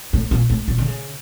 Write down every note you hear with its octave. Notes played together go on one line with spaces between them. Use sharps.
A2
A#2
A2
A#2
D3
C#3